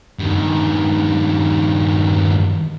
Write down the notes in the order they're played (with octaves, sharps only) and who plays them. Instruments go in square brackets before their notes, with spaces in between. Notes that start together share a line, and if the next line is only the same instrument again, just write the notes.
[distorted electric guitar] G2 D#3